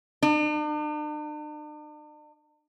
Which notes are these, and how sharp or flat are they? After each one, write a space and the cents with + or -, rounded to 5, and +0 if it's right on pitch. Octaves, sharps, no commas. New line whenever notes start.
D4 +45